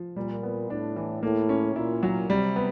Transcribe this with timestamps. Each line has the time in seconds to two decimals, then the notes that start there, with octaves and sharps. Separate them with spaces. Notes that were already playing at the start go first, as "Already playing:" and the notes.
Already playing: F3
0.16 A#2 G3
0.43 B3
0.70 A2 D4
0.96 E3
1.22 A2 A#3
1.49 C#4
1.76 A#2 E4
2.03 F#3
2.29 C3 G3
2.56 B3